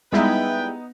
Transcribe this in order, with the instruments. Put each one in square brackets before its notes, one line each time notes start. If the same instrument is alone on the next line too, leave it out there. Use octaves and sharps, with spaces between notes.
[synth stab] G3 G#3 E4 [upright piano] B3 D#4 [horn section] B4 G5